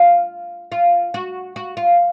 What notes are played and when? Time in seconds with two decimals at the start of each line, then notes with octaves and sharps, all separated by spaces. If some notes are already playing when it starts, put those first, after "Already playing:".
Already playing: F4
0.72 F4
1.14 F#4
1.56 F#4
1.77 F4